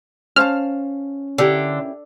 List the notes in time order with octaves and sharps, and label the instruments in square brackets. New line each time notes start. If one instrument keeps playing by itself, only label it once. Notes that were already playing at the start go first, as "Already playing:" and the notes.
[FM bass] C#4 [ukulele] C5 F5 A5 [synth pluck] F6
[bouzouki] D3 [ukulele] E4 G4 A#4